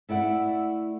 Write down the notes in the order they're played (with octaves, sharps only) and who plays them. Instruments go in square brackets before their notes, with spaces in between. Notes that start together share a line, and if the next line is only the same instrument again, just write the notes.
[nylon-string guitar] A3 E4 D5 F#5